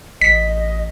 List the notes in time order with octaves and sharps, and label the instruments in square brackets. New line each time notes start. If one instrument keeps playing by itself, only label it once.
[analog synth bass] A1 [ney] D#5 [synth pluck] B6